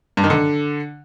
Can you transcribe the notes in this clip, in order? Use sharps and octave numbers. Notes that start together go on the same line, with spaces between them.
G2
D#3
D3